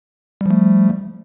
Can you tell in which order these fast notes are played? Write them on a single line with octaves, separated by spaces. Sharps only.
G3 F3 A3